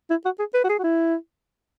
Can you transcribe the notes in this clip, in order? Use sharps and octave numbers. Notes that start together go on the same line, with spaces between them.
E4
F#4
G#4
B4
F#4
G#4
F#4
E4